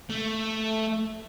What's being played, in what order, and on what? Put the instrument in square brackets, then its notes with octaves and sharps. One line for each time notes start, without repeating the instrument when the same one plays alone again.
[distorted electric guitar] A3